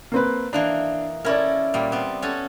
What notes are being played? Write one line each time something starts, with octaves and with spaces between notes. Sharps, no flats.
A#3 C4 B4
E3 A#3 D4 D#4
C#4 E4 A4 A#4 D5
A#2 G3
B3 C4
C#4 F#4 A4